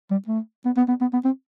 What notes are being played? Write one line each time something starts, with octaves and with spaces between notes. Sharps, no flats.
G3
A3
B3
B3
B3
B3
B3
C4